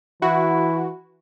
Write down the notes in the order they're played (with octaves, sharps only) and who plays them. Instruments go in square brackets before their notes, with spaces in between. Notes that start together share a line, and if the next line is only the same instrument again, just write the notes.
[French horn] E3 [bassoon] E4 [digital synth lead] F#4